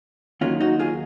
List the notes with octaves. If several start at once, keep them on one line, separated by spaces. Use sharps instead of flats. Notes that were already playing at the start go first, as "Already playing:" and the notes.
D#2 D#3 F#3 A#3 C#4 F4
D#4 F#4
F4 G#4